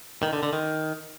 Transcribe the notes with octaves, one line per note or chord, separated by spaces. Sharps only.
D#3
D3
D3
D#3